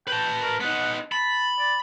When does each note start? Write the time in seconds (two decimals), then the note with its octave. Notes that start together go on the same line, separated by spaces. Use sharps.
0.08 B4 G5 A5
0.41 A#4
0.60 B3 D#4 F#5
1.12 A5 B5
1.59 D5